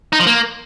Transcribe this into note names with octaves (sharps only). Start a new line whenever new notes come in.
D#4
F3
A#3